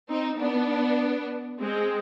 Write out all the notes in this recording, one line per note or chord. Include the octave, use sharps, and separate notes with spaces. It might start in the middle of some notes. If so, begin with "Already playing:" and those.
C4 D#4
B3 D4
G#3 C4